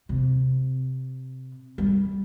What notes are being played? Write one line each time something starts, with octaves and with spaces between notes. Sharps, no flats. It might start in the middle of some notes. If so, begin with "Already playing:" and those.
C3
G3